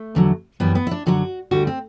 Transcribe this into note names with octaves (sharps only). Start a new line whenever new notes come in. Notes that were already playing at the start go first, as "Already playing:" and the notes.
Already playing: A3
E2 D3 F#3
F#2 E3 G3 B3
B3
E4
D4
F#2 D3 F#3 F#4
D2 D3 G3 F#4
C4